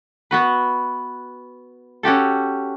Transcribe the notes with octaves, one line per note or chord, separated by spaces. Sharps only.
B3 F#4 B4
C#4 F#4 G4 A4